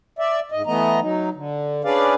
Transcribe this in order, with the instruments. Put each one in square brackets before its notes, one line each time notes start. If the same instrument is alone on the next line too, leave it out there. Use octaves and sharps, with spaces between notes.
[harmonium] D5 E5
G#2 D#5
E3 A3 B3 D#5 A#5
F#3 D#4
D3
C#4 D4 G#4 B4 D5 F5